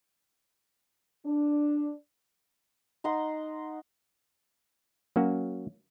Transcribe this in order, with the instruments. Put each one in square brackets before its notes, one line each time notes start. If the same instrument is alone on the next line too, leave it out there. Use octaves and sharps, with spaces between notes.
[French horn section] D4
[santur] D#4 F#5 C6
[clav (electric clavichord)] F#3 A#3 C#4 F#4